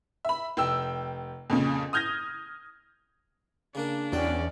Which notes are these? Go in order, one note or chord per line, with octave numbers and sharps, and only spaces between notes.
E5 B5
F1 G5 E6
F2 A#2 C#3
D#6 F6 G6 G#6 A#6
C#3 A#3 D4 A#4
E2 F#3 C#4 D5 G5